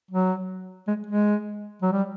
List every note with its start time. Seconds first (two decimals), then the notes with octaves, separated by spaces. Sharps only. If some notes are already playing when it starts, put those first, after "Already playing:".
0.11 F#3
0.87 G#3
1.07 G#3
1.82 F#3
1.92 G3